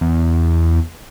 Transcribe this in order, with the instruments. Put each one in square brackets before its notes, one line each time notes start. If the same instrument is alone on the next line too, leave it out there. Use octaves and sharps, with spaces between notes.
[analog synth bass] E2